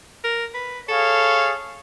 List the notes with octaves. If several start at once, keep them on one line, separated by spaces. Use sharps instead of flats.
A#4
B4
G#4 A4 C#5 F5